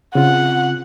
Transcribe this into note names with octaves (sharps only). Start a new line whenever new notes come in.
C#3 C4 F4 F#5